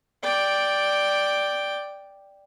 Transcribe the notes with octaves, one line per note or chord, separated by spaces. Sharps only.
D5 G5